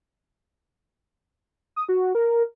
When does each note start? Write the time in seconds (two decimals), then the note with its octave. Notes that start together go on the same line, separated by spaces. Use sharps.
1.76 D#6
1.89 F#4
2.15 A#4